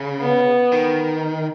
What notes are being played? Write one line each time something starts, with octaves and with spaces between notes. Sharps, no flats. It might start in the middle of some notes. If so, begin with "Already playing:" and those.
Already playing: C#3
B3
D#3